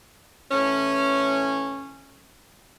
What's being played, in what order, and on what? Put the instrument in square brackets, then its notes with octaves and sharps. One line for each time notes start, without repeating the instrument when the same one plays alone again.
[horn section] A2 E3 C#4